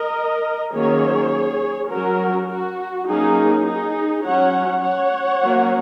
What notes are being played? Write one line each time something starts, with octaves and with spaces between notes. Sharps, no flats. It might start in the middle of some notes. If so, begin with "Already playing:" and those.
Already playing: A#4 D#5
D#3 F#3 A#3 C#4 G#4 C#5
F#3 C#4 F#4 A#4
F#4
F#3 A#3 C#4 D#4 G#4
D#4 G#4
F#3 C#4 C#5 F#5
C#5 F#5
F#3 A#3 C#4